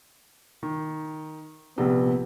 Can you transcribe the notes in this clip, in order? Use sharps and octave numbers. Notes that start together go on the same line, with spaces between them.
D#3
A#1 C3 B3